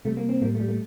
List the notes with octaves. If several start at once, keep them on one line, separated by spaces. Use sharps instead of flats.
C3 G3 A3
A#3
C4
A2 G3 A#3
A3
G3
A3